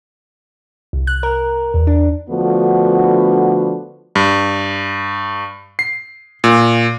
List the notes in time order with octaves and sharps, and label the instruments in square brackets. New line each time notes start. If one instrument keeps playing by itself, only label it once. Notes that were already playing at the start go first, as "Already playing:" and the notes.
[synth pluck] C2
F#6
A#4
E2
D4
[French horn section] D3 F3 A3 B3 D4 F#4
[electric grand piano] G2
C7
A#2